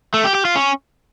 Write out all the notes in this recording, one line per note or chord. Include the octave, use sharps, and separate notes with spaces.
A3
G4
G4
F4
C#4